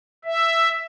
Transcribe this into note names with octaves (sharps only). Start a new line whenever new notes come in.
E5